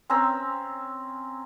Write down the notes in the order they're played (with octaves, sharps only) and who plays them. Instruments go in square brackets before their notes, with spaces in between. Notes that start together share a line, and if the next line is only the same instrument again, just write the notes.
[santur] C4 C#4 A#5 E6